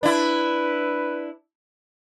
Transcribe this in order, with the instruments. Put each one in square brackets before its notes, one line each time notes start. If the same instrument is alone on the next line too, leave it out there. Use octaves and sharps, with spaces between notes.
[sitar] D4 E4 [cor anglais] B4